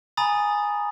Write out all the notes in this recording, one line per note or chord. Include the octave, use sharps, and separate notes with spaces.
G#5 A#5 B5 D#6 A6